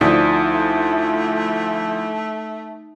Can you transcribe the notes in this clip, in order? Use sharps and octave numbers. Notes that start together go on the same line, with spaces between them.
D2 F3 A3 D#4 E4 D5 D#6 B6